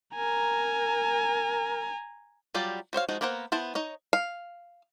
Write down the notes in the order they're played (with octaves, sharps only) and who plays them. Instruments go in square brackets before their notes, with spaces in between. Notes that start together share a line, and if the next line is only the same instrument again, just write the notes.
[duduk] A#4 [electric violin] G#5 A#5
[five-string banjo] F#3 G3 F4 G4 D5
F#4 C5 C#5 F5
F3 G#3 D#4 F#4
A#3 B3 A#4 C5 F#5
B3 E4 C5 A5
D#4 C#5 D#5
F5